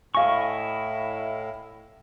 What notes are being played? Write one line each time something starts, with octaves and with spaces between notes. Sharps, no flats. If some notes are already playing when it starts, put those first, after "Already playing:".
A2 E4 D#5 F5 G#5 C#6